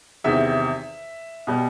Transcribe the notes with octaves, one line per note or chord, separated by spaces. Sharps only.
E2 C3 D#3 E5
B2 G3